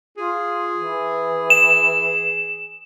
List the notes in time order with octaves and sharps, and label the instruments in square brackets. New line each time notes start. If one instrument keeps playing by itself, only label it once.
[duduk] F4 [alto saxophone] G#4
[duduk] E3
[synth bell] E7